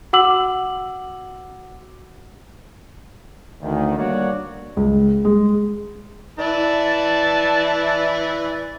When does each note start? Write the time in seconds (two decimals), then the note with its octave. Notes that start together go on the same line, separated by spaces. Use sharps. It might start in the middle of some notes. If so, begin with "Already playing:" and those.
0.13 F#4 F#5 D6 E6 F#7
3.63 D2 D#3
3.97 G3 A#3 D4 F#4 C#5 D5
4.77 C#2
5.25 G#3
6.39 E3 E4 D5 A5